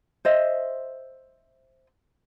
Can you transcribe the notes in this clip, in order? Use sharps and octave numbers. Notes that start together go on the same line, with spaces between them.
C5 D#5 E5